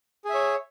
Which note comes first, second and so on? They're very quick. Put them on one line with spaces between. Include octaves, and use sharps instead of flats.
G#4 E5 C#5